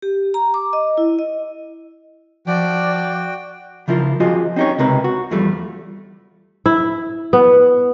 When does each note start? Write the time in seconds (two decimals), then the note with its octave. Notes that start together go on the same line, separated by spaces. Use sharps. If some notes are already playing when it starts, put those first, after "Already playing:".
0.02 G4
0.34 A#5
0.54 D6
0.73 D#5
0.97 E4
1.19 D#5
2.47 F3 F#4 D5 G5
3.88 C#3 F3 E4 F4 A#4
4.20 F3 F4 F#4 G#4 C5 D#5
4.56 C4 C#4 D#4 G4 C#5
4.79 C#2 C3 A#4 B4
5.04 F#4
5.31 E2 F3 G3 A3
6.66 E4
7.33 B3